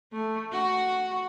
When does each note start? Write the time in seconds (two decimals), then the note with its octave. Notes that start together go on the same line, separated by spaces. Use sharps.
0.13 A3
0.52 F#4